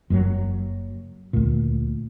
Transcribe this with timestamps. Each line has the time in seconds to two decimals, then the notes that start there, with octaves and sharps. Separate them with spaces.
0.10 F#1 F#2 B2 F#3
1.33 D2 A#2